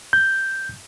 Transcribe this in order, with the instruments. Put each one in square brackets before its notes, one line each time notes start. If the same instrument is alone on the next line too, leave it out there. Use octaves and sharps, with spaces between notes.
[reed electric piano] G6